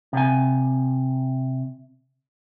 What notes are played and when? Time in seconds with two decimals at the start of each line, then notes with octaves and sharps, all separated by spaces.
0.13 C3 G#5